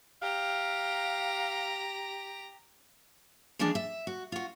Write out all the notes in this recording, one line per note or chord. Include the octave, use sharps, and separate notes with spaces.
G4 F5 A#5
E3 F3 G3 G#3 D4 G#4
E5
F#4
F4 F#4